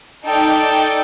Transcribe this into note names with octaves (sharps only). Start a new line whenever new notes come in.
D#4 A4 D5 G5